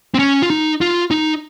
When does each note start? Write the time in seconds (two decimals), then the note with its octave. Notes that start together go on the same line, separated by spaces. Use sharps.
0.14 C4
0.19 C#4
0.42 F4
0.50 D#4
0.81 F4
1.11 D#4